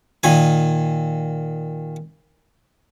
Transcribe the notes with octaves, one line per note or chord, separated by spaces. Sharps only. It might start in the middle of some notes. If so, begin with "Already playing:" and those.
A#2 D#3 G#5